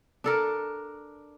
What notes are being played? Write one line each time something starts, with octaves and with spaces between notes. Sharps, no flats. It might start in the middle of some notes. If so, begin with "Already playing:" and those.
D4 A4 A#4